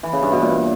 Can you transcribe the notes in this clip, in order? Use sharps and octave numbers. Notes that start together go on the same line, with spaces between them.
E3
C#3
G2
B2
A#2